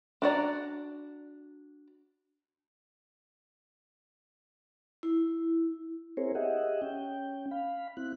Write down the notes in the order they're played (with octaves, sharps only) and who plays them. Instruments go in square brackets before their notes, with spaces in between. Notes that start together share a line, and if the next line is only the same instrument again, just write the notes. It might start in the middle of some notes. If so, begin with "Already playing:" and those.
[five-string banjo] D4 F#4 D5 A#5
[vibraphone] E4
[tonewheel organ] C4 E4 G#4 A#4 C5 C#5
G4 G#4 D#5 E5 F#5
C#4 G5
F5 B5
C4 E4 F#6